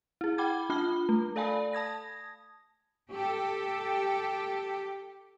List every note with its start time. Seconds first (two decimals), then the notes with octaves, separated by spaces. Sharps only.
0.21 E4 G#4
0.38 F#5 G5 B5 D6 G#6
0.70 D4 F4 A5 B5 F6 G7
1.09 A3
1.36 A4 D5 F5 G#5 A5 B5
1.73 A5 D#6 G#6 A#6
3.10 G4 A4